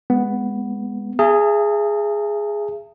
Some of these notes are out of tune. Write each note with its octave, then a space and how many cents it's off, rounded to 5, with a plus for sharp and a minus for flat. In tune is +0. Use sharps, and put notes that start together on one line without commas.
G#3 -15 B3 +0
G#4 +0 E5 +35 A5 +45